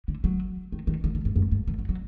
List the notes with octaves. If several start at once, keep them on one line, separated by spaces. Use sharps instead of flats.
D3
F#3
D#3
D#3
D#3
D3
G2
F#2
G2
D#3
F#3
F#3